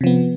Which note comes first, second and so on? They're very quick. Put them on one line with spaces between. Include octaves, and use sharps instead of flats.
C3 F3 B3